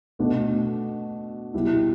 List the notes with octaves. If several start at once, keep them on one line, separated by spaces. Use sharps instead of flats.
B2 A3 D4
B2 G3 E4